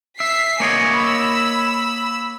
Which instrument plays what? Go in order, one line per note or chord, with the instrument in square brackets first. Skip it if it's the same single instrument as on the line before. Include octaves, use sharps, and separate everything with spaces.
[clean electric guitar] E5 [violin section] B6 C7
[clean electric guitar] A#3 C#5 D#5 [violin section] G#5
[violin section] B5 E6